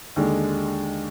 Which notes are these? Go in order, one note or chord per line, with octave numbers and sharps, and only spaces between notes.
D#2 D3 G#3 D4